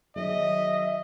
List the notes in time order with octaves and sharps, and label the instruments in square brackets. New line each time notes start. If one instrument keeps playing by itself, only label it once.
[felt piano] D#3 F#3 G#4 [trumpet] D#5 [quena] E5